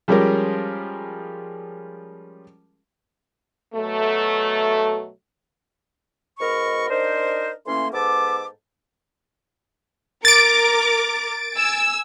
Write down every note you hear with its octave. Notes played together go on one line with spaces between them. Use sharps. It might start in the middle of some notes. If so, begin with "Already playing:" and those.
F3 G3 G#3 C#4 G4 A#4
B2 F#3 A3
G#2 B2 A#4 D#5 B5 C#6
D4 D#4 A#4 C5
E3 A3 A#3 C#4 C6
G#2 B3 A4 A5 D6
A#4 D6 A6 D7
G#5 E6